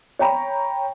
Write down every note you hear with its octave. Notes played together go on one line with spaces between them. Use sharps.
C#5 G5 A#5 B5